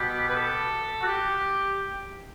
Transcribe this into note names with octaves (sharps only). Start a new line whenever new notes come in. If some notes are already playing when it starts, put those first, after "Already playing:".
Already playing: B2 G3 B3 G4
B4
A4
F#4
G4